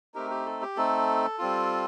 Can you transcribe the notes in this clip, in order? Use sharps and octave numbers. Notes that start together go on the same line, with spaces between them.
A3 C4 D#4 G4 A#4
G4
A4
G4
A3 C4 D#4 A4
G3 C4 F4